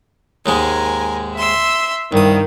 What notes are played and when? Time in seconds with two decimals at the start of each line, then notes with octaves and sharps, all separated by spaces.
0.46 D#2 G#2 G#3 A#4 G#5
1.37 E5 C6 E6
2.12 C2 G2 D#3 D#6